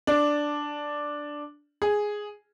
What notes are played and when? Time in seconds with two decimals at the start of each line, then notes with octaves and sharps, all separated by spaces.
0.07 D4
1.82 G#4